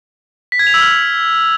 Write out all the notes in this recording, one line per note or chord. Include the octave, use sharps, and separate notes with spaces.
B6
G#6
F7
E6
F6